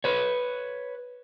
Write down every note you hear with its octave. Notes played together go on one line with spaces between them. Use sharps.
B4 C#5